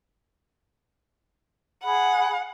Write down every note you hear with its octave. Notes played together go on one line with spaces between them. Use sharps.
G#4 F#5 B5